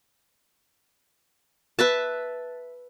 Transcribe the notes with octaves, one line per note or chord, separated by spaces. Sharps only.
B4 E5 A5